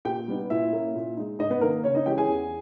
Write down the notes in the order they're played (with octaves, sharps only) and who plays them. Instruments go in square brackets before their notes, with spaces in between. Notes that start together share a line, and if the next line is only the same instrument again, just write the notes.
[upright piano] A#2 G4 G5
G3 B3 D#4
A#2 E4 E5
A#3 C#4
A#2
G#3 D#4
G#2 D#4 D#5
B3 B4
D#3 A#3 D#4 A#4
C#3 C#4 C#5
D#4 D#5
E3 G#3 C#4 G4 G5
G#4 G#5
E2